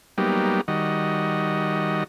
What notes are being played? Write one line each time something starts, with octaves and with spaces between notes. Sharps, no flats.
F#3 G3 A#3 B3 D#4 G4
D#3 G3 F#4 D#5